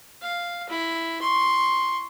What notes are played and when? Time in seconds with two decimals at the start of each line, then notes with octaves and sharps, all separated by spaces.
0.22 F5
0.69 E4
1.22 C6 C#6